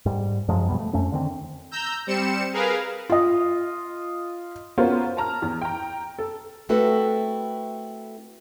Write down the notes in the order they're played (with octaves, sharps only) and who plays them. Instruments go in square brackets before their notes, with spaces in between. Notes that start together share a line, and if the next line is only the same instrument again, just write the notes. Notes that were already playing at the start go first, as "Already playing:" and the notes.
[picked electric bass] G#2 G3
F#2 F3 F#3 G#3
F2 B2 G3 B3
A3
F2 A3 C#4
D3 D#3 C4
[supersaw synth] A#5 E6 G6
G3 C4 C#7 E7
G#4 A#4 B4 F5
[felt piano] F4 D#5
[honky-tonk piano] B3 C#4 F4 F#4 A#4 C5
A5 A#5 F6
E2
G5 A#5
A4
[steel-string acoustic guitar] A3 C4 E4 F#4 A4 B4